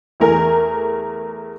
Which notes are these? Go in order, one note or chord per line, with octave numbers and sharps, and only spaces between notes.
E2 A3 A#4 G#5